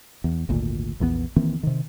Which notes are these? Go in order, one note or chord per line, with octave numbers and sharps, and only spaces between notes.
E2
G#1 D2 A#2
A#1 E2 C#3 B3
D#3 E3 A#3 C4
C3 D#3